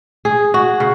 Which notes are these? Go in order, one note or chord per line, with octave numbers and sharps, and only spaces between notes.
G#4
F#4
C#3